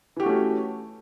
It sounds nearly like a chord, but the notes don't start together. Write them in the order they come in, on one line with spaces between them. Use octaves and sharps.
E3 G4 F#4 A3 C#4